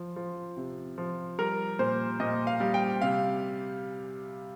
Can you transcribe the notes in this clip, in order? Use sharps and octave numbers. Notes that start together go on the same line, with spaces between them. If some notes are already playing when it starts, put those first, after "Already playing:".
Already playing: F3
F3
C3
F3
G3 A#4
A#2 C5
A#2 D#5
F5
G3
G5
C3 F5